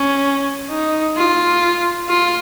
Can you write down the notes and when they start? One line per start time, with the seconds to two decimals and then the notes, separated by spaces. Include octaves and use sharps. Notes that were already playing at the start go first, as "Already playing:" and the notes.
Already playing: C#4
0.70 D#4
1.17 F4
2.09 F4